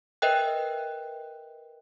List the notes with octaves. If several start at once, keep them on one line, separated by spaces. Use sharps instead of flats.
A#4 B4 D#5 E5 G5 F#6